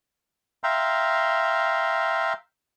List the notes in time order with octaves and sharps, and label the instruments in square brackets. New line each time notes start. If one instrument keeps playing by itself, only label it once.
[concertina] E5 F5 G5 A#5 C6